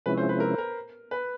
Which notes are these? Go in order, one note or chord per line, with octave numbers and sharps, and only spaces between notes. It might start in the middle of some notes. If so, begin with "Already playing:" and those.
C3 F3 G#3 C#4 E4 B4
C5
B4
A#4
A#4
B4